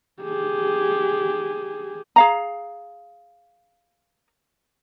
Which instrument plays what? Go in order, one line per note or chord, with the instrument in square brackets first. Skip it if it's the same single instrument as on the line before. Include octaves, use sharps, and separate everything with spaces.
[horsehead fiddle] G4 G#4
[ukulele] G#4 F5 A#5